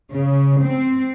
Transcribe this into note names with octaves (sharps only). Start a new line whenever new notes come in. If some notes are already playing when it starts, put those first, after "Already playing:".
C#3
C4